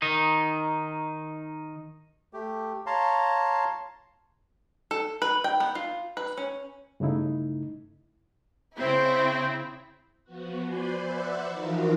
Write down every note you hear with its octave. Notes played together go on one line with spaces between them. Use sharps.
D#3 D#4
A3 G4
C#5 F5 A5 A#5 C6
A4
B4
G5
B3
F4
B4
C#4
G2 C#3 A3 D#4 E4
C#3 C4 E4
F3 B3 F#4
B4 C5 D5 G#5 B5 C6
B4 C5 D5 E5 F#5
E3 F3 D#4 F4 F#4 A#4